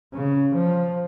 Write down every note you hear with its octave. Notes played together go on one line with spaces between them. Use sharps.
C#3
F3